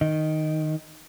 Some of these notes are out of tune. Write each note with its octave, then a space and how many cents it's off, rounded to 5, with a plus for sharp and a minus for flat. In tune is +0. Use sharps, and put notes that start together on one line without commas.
D#3 +0 D#5 +0